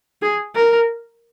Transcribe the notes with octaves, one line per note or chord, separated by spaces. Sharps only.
G#4
A#4